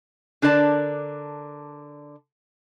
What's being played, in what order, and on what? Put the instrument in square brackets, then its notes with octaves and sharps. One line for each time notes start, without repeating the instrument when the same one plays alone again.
[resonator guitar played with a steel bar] D3 D4 A#4 D5 A5